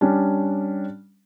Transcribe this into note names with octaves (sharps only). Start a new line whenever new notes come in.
G3 C#4 D4